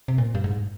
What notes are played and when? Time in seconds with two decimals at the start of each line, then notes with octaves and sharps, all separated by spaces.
0.08 C3
0.18 A#2
0.35 G2
0.44 G#2